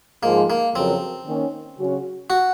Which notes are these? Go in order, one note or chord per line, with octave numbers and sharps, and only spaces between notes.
G#2 F3 G#3 A#3
A#3
F2 C#3 F#3 A#3 C4
D#3 A#3 C#4
C#3 F#3 C#4 F#4
F#4